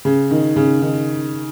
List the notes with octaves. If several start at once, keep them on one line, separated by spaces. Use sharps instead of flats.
C#3
D#3
C#3
D#3